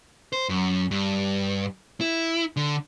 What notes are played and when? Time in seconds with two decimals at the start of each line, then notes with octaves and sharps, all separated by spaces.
0.33 C5
0.49 F#2
0.91 G2
2.01 E4
2.57 D3